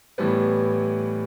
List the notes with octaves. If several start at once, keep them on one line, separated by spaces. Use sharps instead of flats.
A2 E3 G3 B3